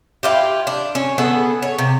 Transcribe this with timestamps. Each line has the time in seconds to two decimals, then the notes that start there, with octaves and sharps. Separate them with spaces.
0.23 E4 F4 G4
0.67 D4
0.95 C#4
1.18 B3 G#4 A4 B4
1.62 C#5
1.78 C3